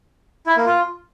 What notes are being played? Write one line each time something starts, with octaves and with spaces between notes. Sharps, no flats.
E4
A#3
F4